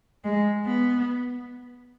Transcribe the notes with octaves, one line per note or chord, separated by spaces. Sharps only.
G#3
B3